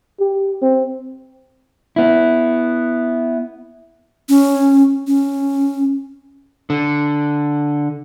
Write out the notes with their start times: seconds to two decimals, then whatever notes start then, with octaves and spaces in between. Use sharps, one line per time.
0.20 G4
0.62 C4
1.96 B3 E4
4.29 C#4
5.07 C#4
6.70 D3